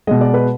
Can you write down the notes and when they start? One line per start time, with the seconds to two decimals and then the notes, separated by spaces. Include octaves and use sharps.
0.07 B2 G#3 D#5
0.21 D5
0.34 B4